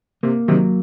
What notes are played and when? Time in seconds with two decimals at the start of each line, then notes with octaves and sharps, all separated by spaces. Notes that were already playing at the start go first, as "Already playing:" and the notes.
0.23 C3 A#3
0.48 C3 D#3 F#3